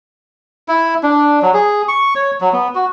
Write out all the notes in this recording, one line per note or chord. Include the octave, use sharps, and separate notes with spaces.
E4
D4
F#3
G#4
C#6
C#5
F#3
B3
F#4